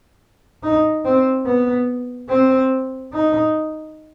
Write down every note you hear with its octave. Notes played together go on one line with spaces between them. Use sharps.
D#4
C4
B3
C4
D#4